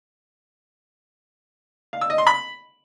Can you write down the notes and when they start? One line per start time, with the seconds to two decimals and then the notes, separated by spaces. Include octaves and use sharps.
1.93 F5
2.01 E6
2.10 D#5
2.18 C6
2.27 B5